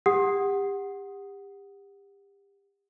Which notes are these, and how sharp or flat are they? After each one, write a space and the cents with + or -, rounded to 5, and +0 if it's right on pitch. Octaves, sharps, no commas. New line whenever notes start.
G4 +30 F#5 +0 D#6 +0